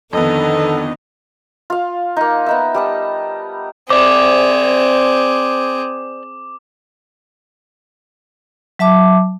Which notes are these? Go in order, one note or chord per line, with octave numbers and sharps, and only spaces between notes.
F2 D3 D#3 B3 A4 D#5
F4 F5
A#3 D#4
B3 D#4 E5
G3 D#5 A5
C4 G#4 C5 D5 D6
F#3 E5 A5 D6